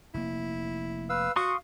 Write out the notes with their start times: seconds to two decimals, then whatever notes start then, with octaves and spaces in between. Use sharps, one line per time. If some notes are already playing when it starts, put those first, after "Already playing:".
0.14 F1 A#3 E4
1.10 B4 F5 E6
1.36 F#4 F5 C6 C#6 D#6